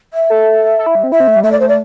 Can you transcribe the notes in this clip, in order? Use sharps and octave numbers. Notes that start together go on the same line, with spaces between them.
E5
A4
A4
E4
G3
C4
E4 E5
C4
A3
G3
A3 E5
D5
A3 C5
D5